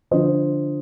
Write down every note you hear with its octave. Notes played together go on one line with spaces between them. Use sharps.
D3 F3 C5 D#5